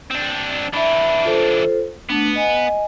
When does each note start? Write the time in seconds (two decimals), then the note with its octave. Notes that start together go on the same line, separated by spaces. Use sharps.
0.11 C4 D4
0.74 E3 D4 E5 B5
1.24 F4 A4 C5
2.09 A3 B3 D4
2.36 D#5 G#5